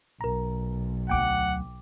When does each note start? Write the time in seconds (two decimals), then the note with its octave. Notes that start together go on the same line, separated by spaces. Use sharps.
0.21 B1 A#4 A#5
1.09 D2 F#3 F#5 G5 D6